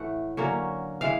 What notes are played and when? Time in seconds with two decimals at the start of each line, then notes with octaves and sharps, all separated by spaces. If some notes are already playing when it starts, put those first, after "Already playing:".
Already playing: A2 E3 A3 F#5
0.37 D3 F#3 A#3 C#4
1.01 E3 G#3 F5